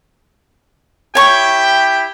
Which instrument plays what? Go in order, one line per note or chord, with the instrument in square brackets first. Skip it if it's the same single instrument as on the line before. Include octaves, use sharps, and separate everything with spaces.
[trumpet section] E4 G4 G5 [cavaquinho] C#5 C#6